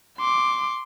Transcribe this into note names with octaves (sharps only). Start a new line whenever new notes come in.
C6 D6